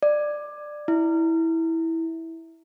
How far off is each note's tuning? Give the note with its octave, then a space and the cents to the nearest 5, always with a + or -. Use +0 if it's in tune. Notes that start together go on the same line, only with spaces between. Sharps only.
D5 +15
E4 -10